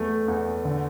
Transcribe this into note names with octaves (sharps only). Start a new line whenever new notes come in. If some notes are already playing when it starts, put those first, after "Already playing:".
Already playing: E2 A3
E2
D3